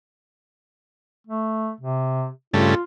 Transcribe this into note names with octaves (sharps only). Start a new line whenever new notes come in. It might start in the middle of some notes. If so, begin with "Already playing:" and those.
A3
C3
G2 C#3 A3 F4